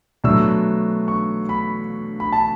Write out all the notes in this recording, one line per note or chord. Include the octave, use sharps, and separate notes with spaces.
B2 F#3 A3 D4 E6
C#6
B5
B5
A5